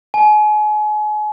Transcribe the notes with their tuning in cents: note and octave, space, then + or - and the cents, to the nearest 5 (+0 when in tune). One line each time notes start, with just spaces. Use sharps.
G#5 +35